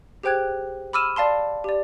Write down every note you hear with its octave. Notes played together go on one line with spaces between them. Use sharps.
G4 G#4 C5 G5 F#6 G#6
B5 D6 E6 F6 D#7 E7
D5 F5 A5 C6
G4 D5